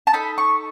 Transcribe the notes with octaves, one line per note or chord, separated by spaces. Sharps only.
A5
D#4 A4 B5
C#6